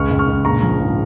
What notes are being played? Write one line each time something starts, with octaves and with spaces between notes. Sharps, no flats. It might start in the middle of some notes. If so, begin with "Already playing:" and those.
Already playing: C#2 C#6 F6
C#2
C#6 F6
C#2
A#1 A#5 C#6
F3
G#2